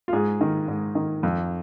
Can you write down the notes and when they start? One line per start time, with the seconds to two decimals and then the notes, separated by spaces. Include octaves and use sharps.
0.08 F4
0.13 G#2 G#4
0.41 D#3
0.68 G#2
0.95 D#3
1.23 F2